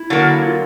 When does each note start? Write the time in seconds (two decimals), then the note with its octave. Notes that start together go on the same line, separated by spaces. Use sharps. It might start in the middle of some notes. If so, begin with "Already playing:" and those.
Already playing: E4
0.10 D3 F#3 A#3
0.45 F4